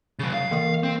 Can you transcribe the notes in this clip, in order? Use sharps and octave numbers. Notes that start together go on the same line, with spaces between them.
C#3 F#3 A6
F5
E3 A#3 A#4
C4